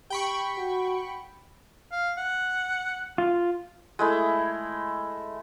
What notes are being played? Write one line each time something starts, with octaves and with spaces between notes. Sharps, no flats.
G4 G5 B5 C#6
F#4
F5
F#5
F4
G#3 A3 E4